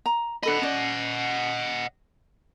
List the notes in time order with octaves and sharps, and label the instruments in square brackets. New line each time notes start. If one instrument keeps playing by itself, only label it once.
[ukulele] A#5
[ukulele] D4 A4 B5 [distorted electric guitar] D#5 F#5
[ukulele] C#4 D5